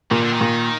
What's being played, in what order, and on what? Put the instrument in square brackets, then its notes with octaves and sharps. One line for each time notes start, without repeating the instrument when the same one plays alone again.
[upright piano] A#2 [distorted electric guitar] D#3
[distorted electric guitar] D3
D#3
[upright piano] A#2